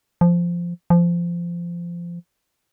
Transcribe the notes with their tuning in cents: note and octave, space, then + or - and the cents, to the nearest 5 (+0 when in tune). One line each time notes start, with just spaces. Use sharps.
F3 -10
F3 -20